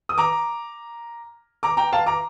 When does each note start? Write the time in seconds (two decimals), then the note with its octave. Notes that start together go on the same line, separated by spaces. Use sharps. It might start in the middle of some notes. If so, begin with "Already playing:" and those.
0.09 D#6
0.18 A#5 D6
1.63 A#5 D6
1.77 G5 A#5
1.93 F5 A5
2.06 A#5 D6